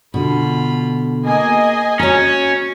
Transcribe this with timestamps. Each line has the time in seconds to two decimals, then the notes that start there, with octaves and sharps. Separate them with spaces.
0.14 B2 D3 F4 B5
1.24 A#3 G#4 D#5 G#5 D#6
1.99 C#4 F#4 C#5 A#5